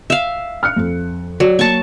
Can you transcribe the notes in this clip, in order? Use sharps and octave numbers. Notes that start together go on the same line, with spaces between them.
E5 F5
F6 F#6 C#7
F2
F#3 D5
A#3 A5 C#6